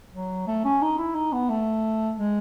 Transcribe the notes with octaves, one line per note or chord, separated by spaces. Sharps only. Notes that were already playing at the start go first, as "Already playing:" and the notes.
F#3
A3
C#4
D#4
E4
D#4
B3
A3
G#3